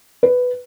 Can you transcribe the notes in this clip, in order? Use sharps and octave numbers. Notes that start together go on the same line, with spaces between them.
B4